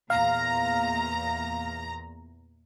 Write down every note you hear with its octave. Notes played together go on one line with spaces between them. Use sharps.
E2 A#2 F5 A#5